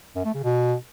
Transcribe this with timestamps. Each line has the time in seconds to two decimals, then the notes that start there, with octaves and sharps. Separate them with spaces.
0.16 F#2
0.25 A3
0.35 C#3
0.44 B2